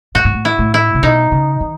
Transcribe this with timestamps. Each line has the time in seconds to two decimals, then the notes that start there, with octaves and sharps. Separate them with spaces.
0.15 A2 F#4
0.25 G#2
0.34 A2
0.45 E4
0.59 A2
0.74 E4
0.95 C#3
1.03 B2 D#4
1.32 C#3
1.61 D#3